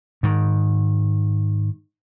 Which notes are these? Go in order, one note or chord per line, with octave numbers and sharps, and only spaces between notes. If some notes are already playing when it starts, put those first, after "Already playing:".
G#2 D#3